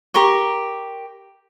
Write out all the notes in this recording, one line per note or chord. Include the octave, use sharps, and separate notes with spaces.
G4 A#4 C6 C#6